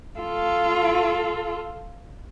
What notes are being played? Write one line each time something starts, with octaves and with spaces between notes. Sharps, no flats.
F4 A4